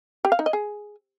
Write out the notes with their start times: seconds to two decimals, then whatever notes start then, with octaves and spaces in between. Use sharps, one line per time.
0.25 G4
0.32 F5
0.39 D#4
0.46 D#5
0.53 G#4